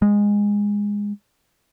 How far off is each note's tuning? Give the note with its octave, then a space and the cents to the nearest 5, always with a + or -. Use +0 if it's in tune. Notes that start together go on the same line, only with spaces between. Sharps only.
G#3 -15